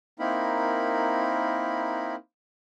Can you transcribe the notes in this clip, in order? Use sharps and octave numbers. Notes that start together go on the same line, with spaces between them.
A#3 C4 D#4 E4 A#4 B5